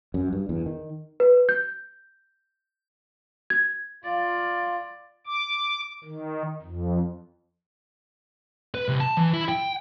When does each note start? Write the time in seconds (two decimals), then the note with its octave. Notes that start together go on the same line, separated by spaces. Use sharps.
0.14 F#2
0.33 G2
0.49 E2
0.66 D#3
1.20 B4
1.49 G6
3.50 G#6
4.04 F4 D5
5.26 D6
6.04 D#3
6.62 F2
8.75 B4
8.88 C2
9.00 A5
9.17 E3
9.34 E4
9.49 G5